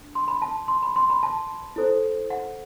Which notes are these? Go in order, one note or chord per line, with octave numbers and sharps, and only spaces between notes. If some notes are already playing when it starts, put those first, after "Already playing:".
Already playing: D4
C6
B5
A5
C6
B5
C6
B5
A5
E4 A4 C5
F#5